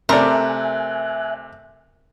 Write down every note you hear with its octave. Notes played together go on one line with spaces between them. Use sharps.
C3 A3 A#4 D5 E5 G#5 F#6